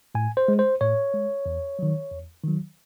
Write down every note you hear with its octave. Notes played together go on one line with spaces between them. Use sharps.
A2 G#5
C5
G#3
C5
A2 C#5
G#3
E2
D#3 F#3
E2
D#3 F#3